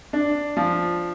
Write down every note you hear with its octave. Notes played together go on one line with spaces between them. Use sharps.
D4
F3